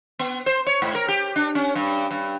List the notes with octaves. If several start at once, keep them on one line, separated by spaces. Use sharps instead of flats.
B3
C5
C#5
G#2
A#4
G4
D4
C#4
G2
G2